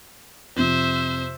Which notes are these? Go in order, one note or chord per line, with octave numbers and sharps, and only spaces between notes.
F2 C3 C5 E5